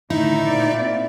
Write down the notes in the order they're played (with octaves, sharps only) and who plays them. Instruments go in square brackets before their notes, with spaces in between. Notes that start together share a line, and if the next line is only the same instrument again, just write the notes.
[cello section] A2 D3 D#3 [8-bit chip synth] D#4 [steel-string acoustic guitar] E4
[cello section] A#2 C4 D5